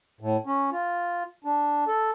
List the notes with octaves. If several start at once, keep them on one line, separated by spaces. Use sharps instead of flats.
A2
C#4
F4
D4
A4